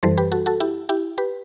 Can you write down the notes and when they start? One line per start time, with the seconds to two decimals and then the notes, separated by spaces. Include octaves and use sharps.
0.03 F#2 E3 G3 A4 C5
0.17 G4 B4
0.32 F#4 A4
0.46 F#4 A4
0.60 E4 G4
0.89 E4 G4
1.18 G4 B4